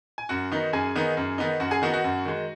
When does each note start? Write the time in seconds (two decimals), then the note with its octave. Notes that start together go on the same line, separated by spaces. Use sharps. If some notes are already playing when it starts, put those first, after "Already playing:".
0.18 G#5
0.29 F#2 F#4 F#5
0.52 D#3 B3 D#4
0.73 F#2 G#4 G#5
0.96 D#3 B3 D#4
1.17 F#2
1.38 D#3 B3 D#4
1.60 F#2 F#4 F#5
1.71 G#4 G#5
1.82 D#3 B3 D#4 F#4 F#5
1.94 F#4 F#5
2.04 F#2
2.25 D#3 G#3